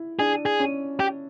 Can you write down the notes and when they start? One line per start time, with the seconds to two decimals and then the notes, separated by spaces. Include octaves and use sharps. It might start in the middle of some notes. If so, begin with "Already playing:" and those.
Already playing: E4
0.19 D4 G#4
0.46 G#4
0.60 C#4
1.00 G4